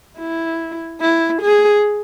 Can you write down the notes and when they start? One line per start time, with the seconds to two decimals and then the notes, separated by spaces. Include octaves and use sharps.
0.18 E4
1.01 E4
1.42 G#4